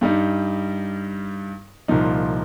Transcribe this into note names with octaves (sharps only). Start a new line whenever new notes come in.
G2 G3 D#4
C2 A#2 F3 D#4